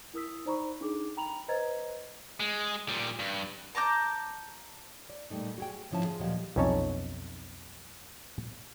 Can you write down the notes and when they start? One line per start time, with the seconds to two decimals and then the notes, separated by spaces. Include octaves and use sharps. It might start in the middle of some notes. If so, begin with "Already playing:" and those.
0.14 E4 A#4 D#6 E6 B6
0.45 D#4 C5 D5 A#5 B5 C#6
0.81 D4 D#4 G#4 A4 D6
1.17 G5 A#5 B5 F7 F#7
1.48 B4 C5 D#5 A#5 G#6 A6
2.40 G#3
2.89 A#2 G3
3.19 G2
3.75 A5 A#5 D6 G6
5.10 D5
5.30 A#2 G3 A3 D#4
5.58 F#4 G#4 G5
5.91 G#2 D3 F3 C#4 E4 A5
6.04 F4 G#4
6.19 D2 A#2 F3 F#3 G4 D#5
6.56 B1 F2 C#4 D#4 C#5 A5